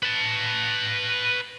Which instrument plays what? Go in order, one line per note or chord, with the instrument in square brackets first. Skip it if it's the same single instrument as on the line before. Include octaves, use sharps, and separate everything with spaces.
[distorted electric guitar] B4 A5